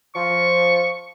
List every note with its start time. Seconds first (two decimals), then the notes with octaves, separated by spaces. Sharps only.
0.15 F3 C#6